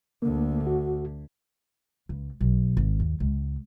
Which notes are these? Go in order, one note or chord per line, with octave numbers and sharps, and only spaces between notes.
D2 D3 A#3
F#4
C#2
B1
G#1
D#2
C#2